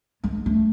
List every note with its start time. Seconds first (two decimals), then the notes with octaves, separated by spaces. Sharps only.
0.24 G#3
0.46 A3